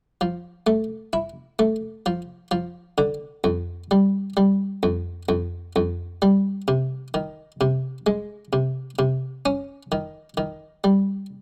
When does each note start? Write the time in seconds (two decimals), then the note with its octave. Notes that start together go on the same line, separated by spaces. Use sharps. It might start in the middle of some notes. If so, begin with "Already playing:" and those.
0.21 F3
0.67 A3
1.13 E4
1.59 A3
2.06 F3
2.51 F3
2.98 D3
3.44 F2
3.91 G3
4.37 G3
4.83 F2
5.29 F2
5.76 F2
6.22 G3
6.68 C3
7.14 D#3
7.61 C3
8.07 G#3
8.53 C3
8.99 C3
9.46 C#4
9.92 D#3
10.37 D#3
10.84 G3